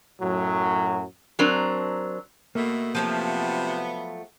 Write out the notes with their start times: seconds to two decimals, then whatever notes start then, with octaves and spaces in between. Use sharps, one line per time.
0.21 F#2 A2 F#3
1.39 F#3 C4 D4 A#4
2.55 B2 A3 A#3
2.95 C3 F3 F#3 A3 B3